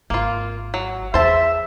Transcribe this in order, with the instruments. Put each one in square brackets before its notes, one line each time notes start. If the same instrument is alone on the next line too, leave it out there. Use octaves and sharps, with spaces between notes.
[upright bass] G#1 [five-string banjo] A#3 F4
[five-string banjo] F#3
[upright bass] E2 [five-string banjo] C5 A5 [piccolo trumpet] E5